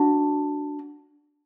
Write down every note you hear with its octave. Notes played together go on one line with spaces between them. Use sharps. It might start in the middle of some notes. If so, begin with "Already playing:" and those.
Already playing: D4 F#4